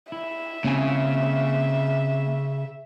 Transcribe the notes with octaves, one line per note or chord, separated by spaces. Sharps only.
E4 E5
C#3 A#3 C4 G#5